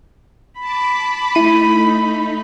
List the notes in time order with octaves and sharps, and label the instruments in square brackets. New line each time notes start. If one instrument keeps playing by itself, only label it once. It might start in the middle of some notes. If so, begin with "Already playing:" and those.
[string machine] A5 D6 [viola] B5
[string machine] A3 D#4 [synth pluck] E4 D#7